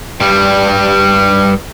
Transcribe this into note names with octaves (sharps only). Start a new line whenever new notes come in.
G2 G3